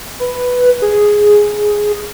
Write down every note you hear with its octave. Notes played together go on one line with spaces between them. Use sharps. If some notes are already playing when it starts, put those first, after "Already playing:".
B4
G#4